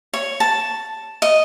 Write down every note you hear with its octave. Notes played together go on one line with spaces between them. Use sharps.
C#5
A5
D#5